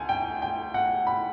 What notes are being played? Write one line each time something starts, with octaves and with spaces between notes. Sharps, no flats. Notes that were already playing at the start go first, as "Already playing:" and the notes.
Already playing: D2 G#5
G5
G5
F#5
B5